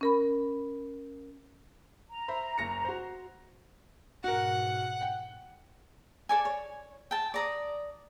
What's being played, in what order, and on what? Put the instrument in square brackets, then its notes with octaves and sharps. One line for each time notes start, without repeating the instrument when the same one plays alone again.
[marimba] C#4 A#4 B5
[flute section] A#5
[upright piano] C5 E5 B5
F#1 A#6 C#7
F#4 C5
[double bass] G#2 B2 [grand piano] F#4 A#4 [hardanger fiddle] F#5
[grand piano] F#5 G5
[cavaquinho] A4 D5 G#5
C#5
G5 A5
D5 A#5 D#6